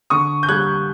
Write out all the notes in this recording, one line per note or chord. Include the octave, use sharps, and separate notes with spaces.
D3 C#6 D#6
G6
G3 F#6 G#6